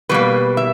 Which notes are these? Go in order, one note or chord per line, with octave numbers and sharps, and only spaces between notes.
B2 G3 A#3 B4
E5